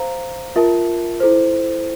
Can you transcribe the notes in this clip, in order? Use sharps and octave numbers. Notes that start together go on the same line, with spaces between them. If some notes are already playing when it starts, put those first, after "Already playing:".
Already playing: C5 F5 A#5
F4 A#4 E5 A5
E4 A4 C5